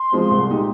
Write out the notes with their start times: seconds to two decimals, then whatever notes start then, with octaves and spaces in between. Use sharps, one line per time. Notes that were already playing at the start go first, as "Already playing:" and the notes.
Already playing: C6
0.12 F3 G#3 C4
0.30 C2
0.49 A#2 G#3 D#4 G4